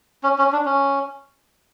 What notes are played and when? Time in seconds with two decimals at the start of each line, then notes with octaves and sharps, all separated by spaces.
0.23 C#4
0.38 C#4
0.52 D4
0.65 C#4